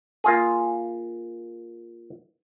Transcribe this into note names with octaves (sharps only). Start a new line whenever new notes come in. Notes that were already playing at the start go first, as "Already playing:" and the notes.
A#3 F4 G#4